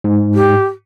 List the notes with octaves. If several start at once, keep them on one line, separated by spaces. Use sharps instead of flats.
G#2
G4